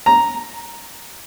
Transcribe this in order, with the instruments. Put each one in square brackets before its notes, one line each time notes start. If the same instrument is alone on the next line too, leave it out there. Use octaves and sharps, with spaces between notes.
[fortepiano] A#5